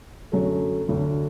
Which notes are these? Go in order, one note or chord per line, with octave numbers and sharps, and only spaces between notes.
F#2 D3 F#3 A3
D2 D3 F#3